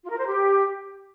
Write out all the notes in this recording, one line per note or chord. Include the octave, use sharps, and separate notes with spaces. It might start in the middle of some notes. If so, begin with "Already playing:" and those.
F4
A#4
C5
G4